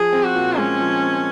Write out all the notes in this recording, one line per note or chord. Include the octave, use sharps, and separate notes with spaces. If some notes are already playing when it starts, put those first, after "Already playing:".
Already playing: F3 G#4
C4
F#4
A#2
G#3 C#4
F3
C4